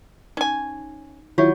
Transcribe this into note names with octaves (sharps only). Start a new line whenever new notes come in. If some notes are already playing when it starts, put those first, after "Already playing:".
C#4 D#4 G#5
D#3 F#3 E4 F4 C#5 C#6